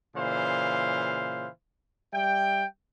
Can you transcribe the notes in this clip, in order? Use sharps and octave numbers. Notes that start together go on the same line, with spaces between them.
A#2 C#3 E3 C5 F5
G3 E5 G5